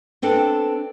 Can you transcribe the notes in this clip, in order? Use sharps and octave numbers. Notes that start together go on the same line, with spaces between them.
B3 C4 D4 A4